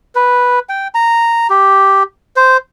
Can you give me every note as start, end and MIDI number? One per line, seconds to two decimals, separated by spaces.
0.15 0.59 71
0.69 0.88 79
0.95 1.47 82
1.50 2.03 67
2.36 2.57 72